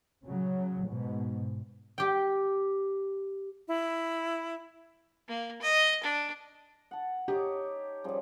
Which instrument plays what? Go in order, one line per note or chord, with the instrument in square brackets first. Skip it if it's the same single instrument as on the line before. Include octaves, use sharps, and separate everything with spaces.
[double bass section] C#3 F#3
G#2 B2
[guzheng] G4 G5
[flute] E4
[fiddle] A#3
D#5
D4
[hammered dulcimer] F#5 A5
[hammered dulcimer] D#4 C#5 D6 [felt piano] G4
[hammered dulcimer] C#3 F3 G3